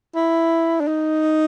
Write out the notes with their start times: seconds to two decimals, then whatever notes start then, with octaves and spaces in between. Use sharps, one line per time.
0.15 E4
0.81 D4
0.88 D#4